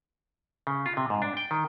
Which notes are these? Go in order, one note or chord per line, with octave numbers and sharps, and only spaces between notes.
C#3
F4
C3
G#2
D4
G5
D#3